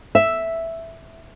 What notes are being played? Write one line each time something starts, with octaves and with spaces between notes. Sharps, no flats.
E5